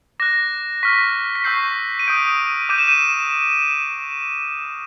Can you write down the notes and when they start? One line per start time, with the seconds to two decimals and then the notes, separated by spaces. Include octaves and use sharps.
0.20 D6 F#6 A#6
0.83 C#6 F6 B6
1.35 B6
1.44 C#6 E6 G6 C7
1.99 D#7
2.08 D#6 G6 D7
2.69 D6 G6 D#7
2.78 E7
2.88 D#7